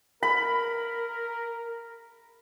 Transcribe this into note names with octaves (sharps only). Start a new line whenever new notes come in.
A#4 B5